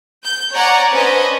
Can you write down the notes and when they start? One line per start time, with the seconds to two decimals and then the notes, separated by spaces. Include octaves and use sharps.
0.24 G6
0.54 C#5 D5 F#5 G#5 A#5
0.93 C#4 D4 B4 C5 D#5